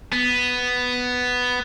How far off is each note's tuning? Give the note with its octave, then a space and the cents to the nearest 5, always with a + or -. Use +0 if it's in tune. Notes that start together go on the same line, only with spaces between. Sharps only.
B3 +5